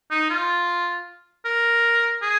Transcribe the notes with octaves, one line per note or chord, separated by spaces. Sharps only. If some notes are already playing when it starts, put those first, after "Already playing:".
D#4
F4
A#4
G#4